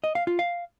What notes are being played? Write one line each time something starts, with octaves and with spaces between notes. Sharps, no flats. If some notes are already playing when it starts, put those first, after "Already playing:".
D#5
F5
F4
F5